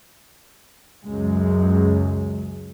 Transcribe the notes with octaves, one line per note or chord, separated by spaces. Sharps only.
C#2 F#2 G#3